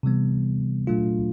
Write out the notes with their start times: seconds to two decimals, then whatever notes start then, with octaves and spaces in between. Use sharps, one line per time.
0.03 C3 E3 G3 B3
0.87 A#2 F#3 A3 D4 F4